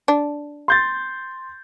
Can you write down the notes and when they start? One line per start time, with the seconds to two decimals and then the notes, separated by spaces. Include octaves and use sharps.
0.08 D4
0.68 C6 G6 A6